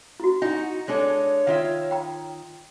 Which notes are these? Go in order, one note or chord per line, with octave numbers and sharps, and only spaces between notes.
E4 F#4
D#4 E4 F#4 G#5
G#3 D4 A4 C#5
D#3 F4 E5
G5 A#5